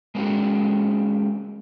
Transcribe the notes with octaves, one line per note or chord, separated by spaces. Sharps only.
G#3 A#3 C4 C#4 F#4 G#4